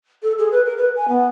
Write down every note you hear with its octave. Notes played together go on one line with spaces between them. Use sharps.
A4
G#4
B4
A#4
B4
G#5
B3